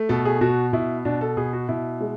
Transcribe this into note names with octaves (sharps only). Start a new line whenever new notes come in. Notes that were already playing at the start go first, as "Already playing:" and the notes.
Already playing: A3
B2 A4
G#4
B2 F#4
B2 E4
B2 D4
A4
B2 G#4
F#4
B2 E4
G#3